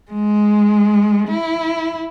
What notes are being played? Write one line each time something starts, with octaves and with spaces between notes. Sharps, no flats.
G#3
E4